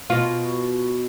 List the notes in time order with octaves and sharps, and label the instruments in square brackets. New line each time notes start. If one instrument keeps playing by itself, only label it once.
[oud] B2 F4